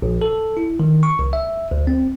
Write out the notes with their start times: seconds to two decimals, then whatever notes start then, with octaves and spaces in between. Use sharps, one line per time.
0.02 A#1
0.22 A4
0.57 E4
0.80 D#3
1.03 C#6
1.19 C2
1.33 E5
1.71 D2
1.87 C4